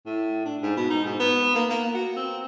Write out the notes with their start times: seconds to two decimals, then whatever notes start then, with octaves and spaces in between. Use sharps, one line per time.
0.06 A2
0.45 D4
0.62 G#2
0.77 B2
0.90 D#4
1.05 G#2
1.20 B3
1.55 A#3
1.70 A#3
1.94 F#4
2.16 C4